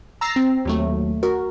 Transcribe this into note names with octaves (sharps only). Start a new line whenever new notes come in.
A#5 E6 A6 A#6 C7
C4
D#2 F#3 A3
F#4 A#4